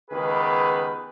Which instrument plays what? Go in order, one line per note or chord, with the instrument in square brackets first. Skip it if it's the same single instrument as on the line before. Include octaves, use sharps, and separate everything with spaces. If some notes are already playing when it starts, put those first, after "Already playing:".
[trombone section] C#2 D#3 B3 G4 G#4 B4